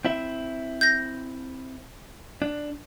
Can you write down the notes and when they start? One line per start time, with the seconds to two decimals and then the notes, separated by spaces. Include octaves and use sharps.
0.05 C4 E4 E5
0.81 G6 A#6
2.42 D4